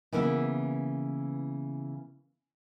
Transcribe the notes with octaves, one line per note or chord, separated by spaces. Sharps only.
C#3 E3 A#3 B3 E4